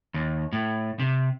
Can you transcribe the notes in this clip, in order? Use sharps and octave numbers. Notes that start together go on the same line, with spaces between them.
D#2
A2
C3